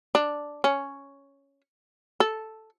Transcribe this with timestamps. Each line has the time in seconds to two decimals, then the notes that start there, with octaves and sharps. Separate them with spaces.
0.15 D4
0.64 C#4
2.20 A4